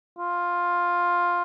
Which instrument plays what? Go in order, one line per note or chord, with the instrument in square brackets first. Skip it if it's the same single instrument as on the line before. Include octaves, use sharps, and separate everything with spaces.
[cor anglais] F4